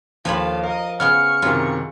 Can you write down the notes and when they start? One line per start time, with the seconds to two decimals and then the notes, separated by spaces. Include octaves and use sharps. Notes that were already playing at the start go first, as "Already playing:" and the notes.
0.25 D#2 F3 A4 C#5 F5 B5
0.64 A#4 D#5 F5
1.00 C#3 B3 C#4 C#6 F6
1.42 F#2 C3 D#3 C#4 F4